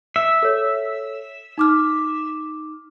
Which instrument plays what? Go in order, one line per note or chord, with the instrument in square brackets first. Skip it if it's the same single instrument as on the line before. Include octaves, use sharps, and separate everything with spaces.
[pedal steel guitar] E5
[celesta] A4 C#5
D#4 D6 F6